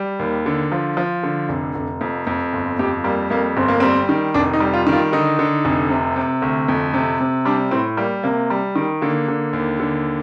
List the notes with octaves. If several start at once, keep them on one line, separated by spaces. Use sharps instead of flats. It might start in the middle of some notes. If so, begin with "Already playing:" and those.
Already playing: G3
D#2
D3
F3
F3
D3
F1
F1
F2
F2
G1
F2 G4
G3 A#3
F2 A#3
G1 C4
A#3
G3 C4
D#3
F1 D4
D#4
G3
F4
D#3
F4
D3 D#4
D3
F1
C3
C3
D2
F2
C3
C3
G3 D4
A2 C4
G3 A#3
C3 A#3
G3
D#3
D3 A#3
D3
D#2
D3